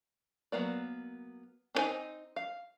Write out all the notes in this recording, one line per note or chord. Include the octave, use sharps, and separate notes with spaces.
F#3 A#3 B3 D5
C4 D4 D#4 C5 G#5
F5